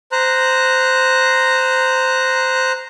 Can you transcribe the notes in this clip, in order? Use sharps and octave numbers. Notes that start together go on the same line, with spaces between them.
C5 A#5 F#6